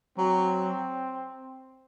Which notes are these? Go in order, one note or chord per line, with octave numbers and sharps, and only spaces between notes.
F#3 C4